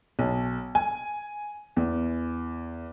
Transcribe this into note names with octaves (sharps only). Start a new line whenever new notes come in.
B1
G#5
E2